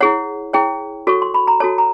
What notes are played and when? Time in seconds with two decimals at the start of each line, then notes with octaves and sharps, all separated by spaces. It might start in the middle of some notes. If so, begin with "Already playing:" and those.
0.01 E4 G#4 C#5 F#5
0.53 E4 G#4 C#5 G5
1.07 F#4 A4 C#5 C#6
1.22 C6
1.34 B5
1.47 A#5
1.60 F#4 A4 C#5 A5
1.78 A#5